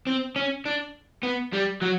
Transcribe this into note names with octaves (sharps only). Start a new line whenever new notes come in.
C4
C#4
D4
B3
G3
F#3